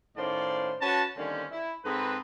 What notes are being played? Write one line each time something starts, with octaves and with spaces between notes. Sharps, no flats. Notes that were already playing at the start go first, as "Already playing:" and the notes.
A2 D#3 C#4 C5 D5 F5
C#4 F#4 B4 A5
D3 D#3 G3 A#3 C4 C#4
E4
G#2 C4 G#4 A4 B4